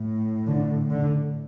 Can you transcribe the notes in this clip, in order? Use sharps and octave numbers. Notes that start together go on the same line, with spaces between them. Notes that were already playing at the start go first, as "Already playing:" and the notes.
Already playing: A2
D3
D3